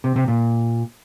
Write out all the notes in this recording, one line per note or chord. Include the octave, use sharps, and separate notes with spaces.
C3
C3
A#2